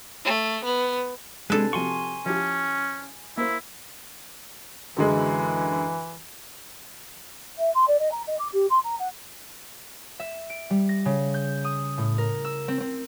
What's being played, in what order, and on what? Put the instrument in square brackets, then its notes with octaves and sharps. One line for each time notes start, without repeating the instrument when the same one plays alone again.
[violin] A3
B3
[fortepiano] C3 D4 G#5 [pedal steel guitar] G#3 [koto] A4 B4
[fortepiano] C3 F3 F#4 [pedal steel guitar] G#5 C6 C#6
[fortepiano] F3 E4 G4 [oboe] C#4
[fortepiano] A#3 C5 [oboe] E4
[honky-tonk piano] F#2 D3 G#3 [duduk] E3
[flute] E5
C6
D5
D#5
A#5
D#5
D6
G4
C6
A#5
F#5
[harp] E5
D7
G3
A#6
C#3
G6
D#6
A2
A#4
E6
C4
C4